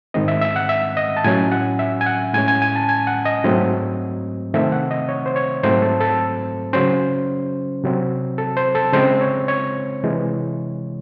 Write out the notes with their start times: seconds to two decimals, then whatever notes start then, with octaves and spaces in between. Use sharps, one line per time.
0.14 G#2 D#3 G#3 C4 D#5
0.28 E5
0.42 E5
0.56 F#5
0.69 E5
0.97 D#5
1.17 A5
1.24 A2 F#3 C#4 G#5
1.52 F#5
1.79 E5
2.01 G#5
2.06 F#5
2.34 A2 G#3 C#4 G#5
2.48 G#5
2.62 G#5
2.76 A5
2.89 G#5
3.07 F#5
3.26 D#5
3.44 G#2 F#3 A3 C4
4.54 C3 D#3 A3 C4 E5
4.72 F#5
4.91 D#5
5.09 C#5
5.26 C5
5.36 C#5
5.63 G#2 F#3 A3 C4 C5
5.82 A4
6.00 A4
6.73 C#3 F#3 C#4 C5
7.84 C3 F#3 C4
8.38 A4
8.57 C5
8.75 A4
8.93 C#3 G#3 C4 C5
9.21 C#5
9.48 C#5
10.03 C3 E3 G#3